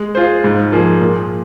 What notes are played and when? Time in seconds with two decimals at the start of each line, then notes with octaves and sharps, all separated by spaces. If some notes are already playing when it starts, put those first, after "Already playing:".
Already playing: G#3
0.15 F4 G#4 C5
0.44 G#2
0.72 F3 A#3 G#4
1.01 A#2